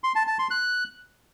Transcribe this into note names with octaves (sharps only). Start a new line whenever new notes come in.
C6
A5
A5
C6
F#6